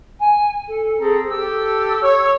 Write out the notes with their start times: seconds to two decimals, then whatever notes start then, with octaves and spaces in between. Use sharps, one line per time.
0.19 G#5
0.67 A4
1.00 C4 G#4 A4 A#5
1.29 G4 A4 E6
2.01 C#5